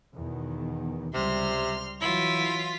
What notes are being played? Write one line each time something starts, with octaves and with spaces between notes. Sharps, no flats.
E2 B2 D#3
C#2 C3 G3 C6 F6
E3 F#3 E4 F4 B6